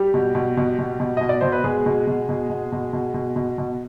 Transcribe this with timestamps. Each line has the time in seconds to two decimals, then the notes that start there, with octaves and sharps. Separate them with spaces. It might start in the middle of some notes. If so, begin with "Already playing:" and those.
Already playing: G3 G4
0.14 B2
0.35 B2
0.57 B2
0.79 B2
1.00 B2
1.17 B2 D#5
1.29 D5
1.41 B2 C5
1.52 B4
1.64 B2 G#3 G#4
1.86 B2
2.07 B2
2.29 B2
2.50 B2
2.72 B2
2.93 B2
3.14 B2
3.36 B2
3.58 B2